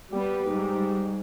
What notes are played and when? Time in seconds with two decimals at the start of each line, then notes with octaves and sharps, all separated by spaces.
0.13 G3 B3 G4 B4
0.50 G#2 G3